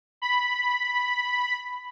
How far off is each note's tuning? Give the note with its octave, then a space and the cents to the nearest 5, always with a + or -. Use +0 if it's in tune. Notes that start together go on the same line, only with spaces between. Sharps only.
B5 +0